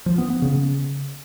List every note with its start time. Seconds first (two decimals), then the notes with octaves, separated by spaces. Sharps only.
0.06 F3
0.18 B3
0.30 B3
0.42 C#3